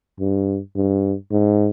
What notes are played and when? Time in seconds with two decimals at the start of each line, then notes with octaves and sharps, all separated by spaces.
0.20 G2
0.75 G2
1.31 G#2